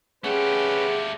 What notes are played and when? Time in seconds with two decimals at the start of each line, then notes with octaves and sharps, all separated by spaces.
0.24 A3 C#4 G4 G#4 B4 F#5